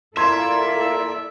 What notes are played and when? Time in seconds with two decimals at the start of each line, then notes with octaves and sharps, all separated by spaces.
0.17 A#3 E4 F4 A4 D5 E5 C6 G#6